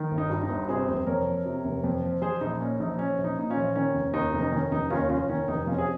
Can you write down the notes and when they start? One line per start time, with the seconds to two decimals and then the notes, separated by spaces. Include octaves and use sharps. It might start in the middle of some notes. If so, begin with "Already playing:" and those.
Already playing: D#3
0.11 G1
0.18 D#4
0.30 G2
0.43 D#4
0.49 G1
0.69 C3 G#4 C5
0.88 F1
1.06 F2 A#4 C#5
1.27 F3
1.45 C3
1.65 F1
1.84 F2
2.03 F3
2.22 F3 G#4 C5
2.41 A#1 D#4
2.60 A#2 C#4
2.80 A#1 D#4
2.99 F3 C#4
3.18 A#1
3.24 D#4
3.37 A#2 D#4
3.50 C#4 F4
3.57 A#1
3.75 D#3 C#4
3.95 F1
4.13 D#2 D#4
4.33 F1
4.43 D#4
4.52 D#3 C#4
4.71 F1 D#4
4.90 D#2 C#4 F4
5.09 F1 C#4 F4
5.29 D#3 C#4
5.48 F1 D#4
5.67 F2 C#4 F4
5.78 G#4